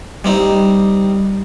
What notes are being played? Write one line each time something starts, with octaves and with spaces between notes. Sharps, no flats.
G3 C4 D#4